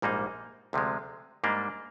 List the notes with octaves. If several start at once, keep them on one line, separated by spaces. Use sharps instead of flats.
A#1 G#2 G3 A#3 D#4
D2 C3 F3 G#3
G#2 G3 A#3 D4